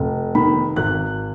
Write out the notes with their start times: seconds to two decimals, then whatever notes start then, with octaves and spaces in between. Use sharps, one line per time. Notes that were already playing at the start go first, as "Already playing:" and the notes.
Already playing: F1
0.35 D#3 B5
0.76 G#1 F#6